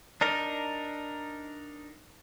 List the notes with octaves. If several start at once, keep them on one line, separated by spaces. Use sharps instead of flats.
D4 D#4 A#4